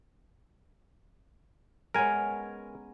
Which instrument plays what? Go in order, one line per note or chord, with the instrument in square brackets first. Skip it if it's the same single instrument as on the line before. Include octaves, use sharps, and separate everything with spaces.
[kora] G#3 B3 C#4 [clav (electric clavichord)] A#4 G#5